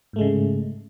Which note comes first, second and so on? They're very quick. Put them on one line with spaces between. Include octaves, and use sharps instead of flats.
G#2 A3 G#3 C#3